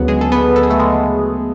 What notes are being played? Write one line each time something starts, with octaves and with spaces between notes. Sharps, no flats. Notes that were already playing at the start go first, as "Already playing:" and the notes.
Already playing: D2 C#3 F#3 B3
G#3 G#4
A4
B3 B4
A4
G#4
A3 A4
G#3 G#4